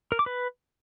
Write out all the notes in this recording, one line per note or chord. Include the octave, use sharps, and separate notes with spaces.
A#4
D6
B4